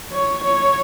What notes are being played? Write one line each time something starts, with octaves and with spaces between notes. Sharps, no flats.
C#5
C#5